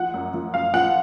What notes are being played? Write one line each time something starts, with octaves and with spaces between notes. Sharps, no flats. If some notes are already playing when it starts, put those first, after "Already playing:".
Already playing: F3 F#5
F#2
F3
F#2 F5
F3 F#5